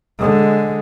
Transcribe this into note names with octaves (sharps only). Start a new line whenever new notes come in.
D3 G#3